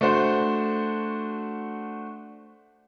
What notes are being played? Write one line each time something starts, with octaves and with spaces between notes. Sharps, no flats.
A3 D4 F#4 C5